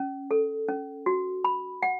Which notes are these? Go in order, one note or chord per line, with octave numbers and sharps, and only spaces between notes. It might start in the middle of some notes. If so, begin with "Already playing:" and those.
Already playing: C#4
A4
C#4
F#4
B5
F#5